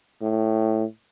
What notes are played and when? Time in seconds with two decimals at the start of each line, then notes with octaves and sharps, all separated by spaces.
0.22 A2